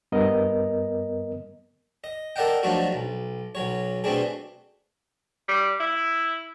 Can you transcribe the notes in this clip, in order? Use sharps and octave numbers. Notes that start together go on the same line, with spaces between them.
G2 B3 A#4 D#5
D#5
A4 A#4 D5 D#5 F#5 G5
F3 F#3 A3 D4 D#4 F#4
B1
B1 F#3 C#5
B2 A3 C4 D4 G#4
G3
E4